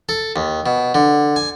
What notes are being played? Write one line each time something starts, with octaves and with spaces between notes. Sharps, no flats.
A4
D#2
B2
D3
G#5